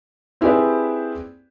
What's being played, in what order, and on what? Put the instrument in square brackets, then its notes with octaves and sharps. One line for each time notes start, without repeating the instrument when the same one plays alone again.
[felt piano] C4 E4 G4 G#4 B4 D5